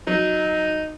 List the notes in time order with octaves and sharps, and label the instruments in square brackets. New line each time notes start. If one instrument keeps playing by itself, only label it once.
[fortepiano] F#3 [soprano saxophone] D#4